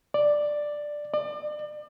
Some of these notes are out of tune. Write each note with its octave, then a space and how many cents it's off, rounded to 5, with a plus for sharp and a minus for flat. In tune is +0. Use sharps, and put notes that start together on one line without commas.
D5 +5
D5 +35